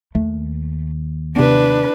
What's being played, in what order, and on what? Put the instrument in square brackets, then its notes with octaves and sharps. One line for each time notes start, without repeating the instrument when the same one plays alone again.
[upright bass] D#2 [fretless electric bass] A3
[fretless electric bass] C3 B3 [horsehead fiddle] D4 B4